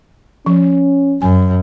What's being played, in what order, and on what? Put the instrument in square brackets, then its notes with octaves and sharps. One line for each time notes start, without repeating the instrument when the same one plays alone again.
[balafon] F3 [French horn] C#4
[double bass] F#2 [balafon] G#5